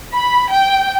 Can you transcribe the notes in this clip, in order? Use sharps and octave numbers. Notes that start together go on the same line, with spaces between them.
B5
G5